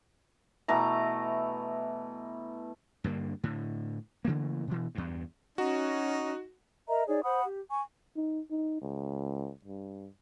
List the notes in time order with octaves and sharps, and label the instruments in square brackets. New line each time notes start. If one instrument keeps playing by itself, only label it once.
[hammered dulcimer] B2 E3 A3 A#5
[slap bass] G2 D3 A#3
A2 D3
C#3 E3 A3 A#3
B2 E3
E2 G2
[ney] C#4 [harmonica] D#4 [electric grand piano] F#4
[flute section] A#4 D#5 E5 A#5
D#4 G#4 C#5 D5
C5 F#5 B5 D#6
G4
G#5 C#6
[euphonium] D#4
D#4
C#2
G2